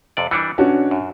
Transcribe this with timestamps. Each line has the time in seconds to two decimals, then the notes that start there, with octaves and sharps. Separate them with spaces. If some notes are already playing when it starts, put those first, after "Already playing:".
0.17 F2 C3 D5
0.31 E3 G3 D4 C#7
0.58 B1 C#4 D4 F#4
0.91 F#2